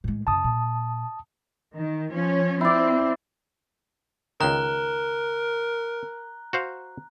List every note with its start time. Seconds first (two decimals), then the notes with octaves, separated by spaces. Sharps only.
0.04 A2 G#3
0.27 F#2 C#3 A5 D#6
0.44 A#2
1.75 D#3
2.12 F3 C#4
2.61 C4 E4 D5
4.41 C#2 D#3 A#4 A#5 F#6 G7
6.53 F#4 C5 F5